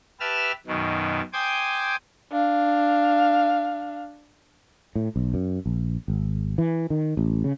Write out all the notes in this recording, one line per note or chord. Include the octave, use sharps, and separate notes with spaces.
G4 B4 E5 A5 E6 F6
F#2 B2 D#3
C5 G5 G#5 D6 D#6 G6
D4 F5
A2
B1
F#2
A#1
G#1
E3
D#3
A1
C#3